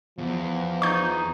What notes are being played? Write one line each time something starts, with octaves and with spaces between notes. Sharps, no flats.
E2 F3
D#4 C#6 G6